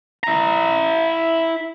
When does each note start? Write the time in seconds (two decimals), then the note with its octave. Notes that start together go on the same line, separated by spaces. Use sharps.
0.23 E4 A#5